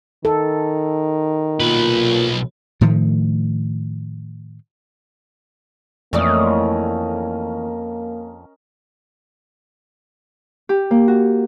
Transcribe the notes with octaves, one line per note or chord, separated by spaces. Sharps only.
D#3 A4
B1 A#2 B4
A2 D#3 F3 A3
F2 E3 A3 A#3 C#4 A#4 D5 D#5
G4
A#3
F#4